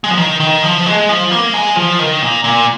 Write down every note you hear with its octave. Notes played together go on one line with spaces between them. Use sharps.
G#3
F3
D#3
D#3
F3
G#3
F3
A#3
G#3
F3
D#3
A#2
A#2